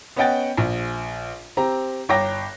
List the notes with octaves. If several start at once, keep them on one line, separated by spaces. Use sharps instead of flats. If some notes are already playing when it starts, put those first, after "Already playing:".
B3 C#4 D#5 F#5 G5 A6
A#1
C4 G4 A#5
G1 C#5 G5 A#5 D6 A#6